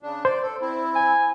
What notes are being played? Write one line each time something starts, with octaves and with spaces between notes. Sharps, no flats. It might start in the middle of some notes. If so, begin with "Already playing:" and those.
C#3 D4
C5 D5
A4
C4 E4
G#5